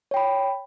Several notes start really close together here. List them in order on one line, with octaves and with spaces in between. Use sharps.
C#5 G5 B5